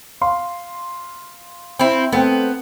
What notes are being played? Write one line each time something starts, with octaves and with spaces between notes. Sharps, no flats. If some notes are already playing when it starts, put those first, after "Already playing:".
F5 C6
C4 E4
A3 B3 C4 G5